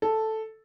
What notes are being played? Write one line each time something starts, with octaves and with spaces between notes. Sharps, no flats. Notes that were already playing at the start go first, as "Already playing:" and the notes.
A4